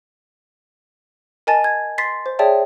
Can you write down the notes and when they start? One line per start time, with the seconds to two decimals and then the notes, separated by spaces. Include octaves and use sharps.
1.47 A#4 D#5 G#5 A5 A6
1.64 G#6
1.98 C6 A6 B6 C7
2.26 C5
2.39 G#4 C#5 D5 E5 G5 A5